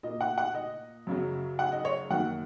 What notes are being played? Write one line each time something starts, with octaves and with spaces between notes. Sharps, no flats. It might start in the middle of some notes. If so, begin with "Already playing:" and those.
A#2 A#3 D#5
F#5
F#5
D#5
F#2 C#3 F#3
F#5
D#5
C#5
F#2 D#3 A#3 F#5